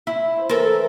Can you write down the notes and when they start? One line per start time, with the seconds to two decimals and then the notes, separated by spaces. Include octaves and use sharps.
0.07 E4
0.37 C5
0.49 E3 A3 A4 A#4